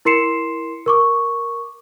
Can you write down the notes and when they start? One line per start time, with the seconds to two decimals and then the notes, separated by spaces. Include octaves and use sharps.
0.05 E4 A#4 C6 C7 C#7 E7
0.86 A#4 C#6 D6